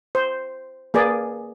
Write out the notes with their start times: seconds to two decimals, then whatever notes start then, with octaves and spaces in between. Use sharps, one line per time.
0.15 C5
0.94 A#3 G#4 B4 D5